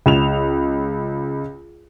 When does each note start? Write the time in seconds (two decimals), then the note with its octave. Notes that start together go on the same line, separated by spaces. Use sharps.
0.06 C#2 E7 F7